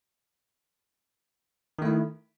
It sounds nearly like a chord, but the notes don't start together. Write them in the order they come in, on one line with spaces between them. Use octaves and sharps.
D#3 A3 E4